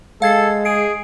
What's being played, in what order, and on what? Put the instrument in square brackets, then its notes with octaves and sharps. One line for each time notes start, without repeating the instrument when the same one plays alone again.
[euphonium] G#3 [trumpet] A4 [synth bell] F5 G#6 C7
[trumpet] G#4 [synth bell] C7 D7